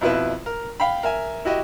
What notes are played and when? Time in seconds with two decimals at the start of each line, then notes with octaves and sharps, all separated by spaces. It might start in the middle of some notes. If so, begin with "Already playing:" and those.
0.01 F2 B2 E4 B4 E5
0.46 A#4
0.80 F5 G5 B5
1.03 A#4 E5 G#5
1.45 E4 F#4 G4 D#5 E5